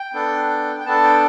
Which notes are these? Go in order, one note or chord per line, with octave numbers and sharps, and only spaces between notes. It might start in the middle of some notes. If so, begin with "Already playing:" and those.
Already playing: G5
B3 D4 A4
G5
B3 D4 A4 A5
G5